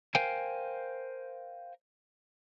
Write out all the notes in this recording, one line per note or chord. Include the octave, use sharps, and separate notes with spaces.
A#4 C5 F5 G5 G#5